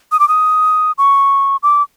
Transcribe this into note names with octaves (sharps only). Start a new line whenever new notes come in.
D#6
D6
D#6
C#6
D6